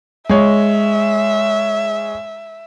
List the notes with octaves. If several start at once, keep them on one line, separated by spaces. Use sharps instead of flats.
G#3 C#5 E5